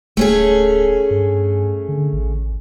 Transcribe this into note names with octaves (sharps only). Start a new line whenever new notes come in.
D1 A3 C#4 G#4
G2
D3
A1